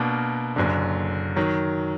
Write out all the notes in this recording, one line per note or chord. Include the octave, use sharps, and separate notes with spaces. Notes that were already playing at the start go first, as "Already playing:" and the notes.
Already playing: B2 A#3 D4 F#4 A#4
F#1 F#2 D3
D#3 F#3